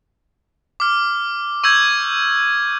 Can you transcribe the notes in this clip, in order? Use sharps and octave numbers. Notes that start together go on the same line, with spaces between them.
D6 F6
C#6 E6 G6 G#6